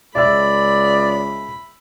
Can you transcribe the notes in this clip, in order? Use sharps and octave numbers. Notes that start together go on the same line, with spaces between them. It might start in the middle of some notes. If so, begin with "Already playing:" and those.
C#2 G#3 D5 E5 B5 E6